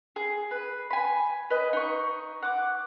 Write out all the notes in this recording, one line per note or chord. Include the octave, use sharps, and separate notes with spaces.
G#4
B4
G#5 B5
B4 D#5
D#4 C#6
F#5 D6